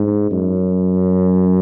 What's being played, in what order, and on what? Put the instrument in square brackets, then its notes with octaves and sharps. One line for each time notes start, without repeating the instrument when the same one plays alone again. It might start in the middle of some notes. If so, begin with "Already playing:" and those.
Already playing: [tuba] G#2
F#2